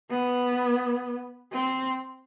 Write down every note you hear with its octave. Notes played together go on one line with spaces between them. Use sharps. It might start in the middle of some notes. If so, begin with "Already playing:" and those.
B3
C4